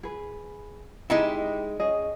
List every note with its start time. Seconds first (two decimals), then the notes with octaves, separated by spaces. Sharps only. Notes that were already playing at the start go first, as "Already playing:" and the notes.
0.03 G#4 B4
1.10 G#3 D#4 E4 G4 G5
1.80 C#4 G#4 D#5